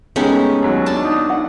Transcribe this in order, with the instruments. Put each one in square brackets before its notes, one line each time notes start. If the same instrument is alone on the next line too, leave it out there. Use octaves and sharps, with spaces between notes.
[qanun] G#3 B3 C#4 [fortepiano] A3 D#4 [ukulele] G4 A#5
[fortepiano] D#2 F#3 F#4
[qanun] D4 A5
[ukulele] D#4
F#5